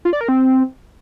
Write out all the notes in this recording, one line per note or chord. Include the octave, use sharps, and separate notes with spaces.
F4
D5
A#4
C4